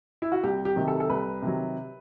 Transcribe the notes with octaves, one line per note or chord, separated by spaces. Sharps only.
E4
F#4
C2 G4
G4
C3 D#3 F#3
A4
A4
C2 B4
C3 D#3 F#3